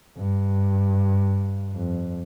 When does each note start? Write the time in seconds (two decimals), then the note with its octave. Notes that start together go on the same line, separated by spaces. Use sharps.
0.17 G2
1.74 F2